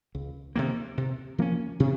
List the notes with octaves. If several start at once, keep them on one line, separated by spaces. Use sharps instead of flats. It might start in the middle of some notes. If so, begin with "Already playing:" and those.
C#2
C3 D#3 A#3
C3
F3 A#3 C#4
C3